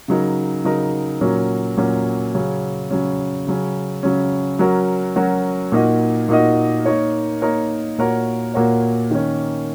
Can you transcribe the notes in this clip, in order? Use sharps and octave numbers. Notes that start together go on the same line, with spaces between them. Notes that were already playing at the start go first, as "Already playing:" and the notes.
C#3 F#3 D#4 A#4
C#3 F#3 D#4 A#4
A#2 F#3 C#4 F#4 A#4
A#2 F#3 C#4 F#4 A#4
C#3 F#3 C#4
C#3 F#3 C#4
C#3 F#3 C#4
C#3 F#3 C#4
F#3 C#4 F#4 A#4
F#3 C#4 F#4 A#4
A#2 A#3 D#4 F#4 D#5
A#2 A#3 D#4 F#4 D#5
A#3 D#4 A#4 C#5
A#3 D#4 A#4 C#5
A#2 A#3 F#4 A#4 C#5
A#2 A#3 F#4 A#4 C#5
D#3 A#3 C#4